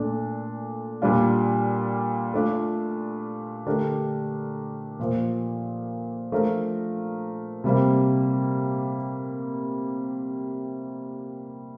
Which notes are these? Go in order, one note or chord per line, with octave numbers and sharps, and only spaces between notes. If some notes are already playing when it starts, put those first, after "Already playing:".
Already playing: A#2 A3 D4 A4
A#2 G3 D4 F4
A3 D4 F4
D3 A3 D4 G4 A#4
A#2 F3 A#3
F3 A3 D4 F4 A#4
C3 G3 A#3